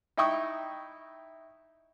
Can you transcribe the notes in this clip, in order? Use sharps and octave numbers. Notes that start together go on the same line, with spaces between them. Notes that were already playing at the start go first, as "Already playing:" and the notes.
D#4 E4 G5 C#6 D#6